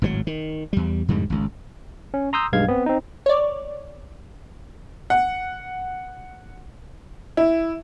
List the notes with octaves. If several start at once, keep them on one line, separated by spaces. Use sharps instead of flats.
G#1 A2 C#3 F#3
D#3
E2 G3
F2 G#2 D3 G3
G#1 C#2
C#4
A#5 C6 D#6 E6 G6
B1 G2 G#3 F5 G#6
B3 C4
C4 D#4
C#5 D5
F#5
E4